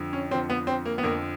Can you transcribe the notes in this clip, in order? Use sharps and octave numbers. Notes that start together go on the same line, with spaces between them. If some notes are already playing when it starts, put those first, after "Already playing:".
Already playing: F2 D3 F3
C#4
F2 D3 F3 C4
B3
C4
A#3
B3
F2 D3 F3 A#3